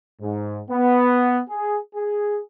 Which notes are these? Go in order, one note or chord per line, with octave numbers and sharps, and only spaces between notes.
G#2
B3
G#4
G#4